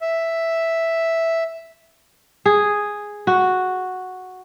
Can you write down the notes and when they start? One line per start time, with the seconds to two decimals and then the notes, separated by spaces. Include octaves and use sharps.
0.01 E5
2.46 G#4
3.27 F#4